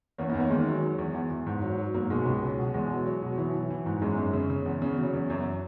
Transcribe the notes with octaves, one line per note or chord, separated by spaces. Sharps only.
E2 A#3 C#4
B3 D#4
E2
A#3 C#4
D#3 G#3
F#3
F#3
E2
E2
E2
G#2
F#3
F#3
G#2 F#3 A#3
B2 G#3
C#2
F#3
B2
E2 G#3
F#3
F#3
B2
E3 F#3
E3
E3
G#2
F#2 G#3
F#2
C#3
C#3
E2
C#3
C#3 F#3
E2
F#2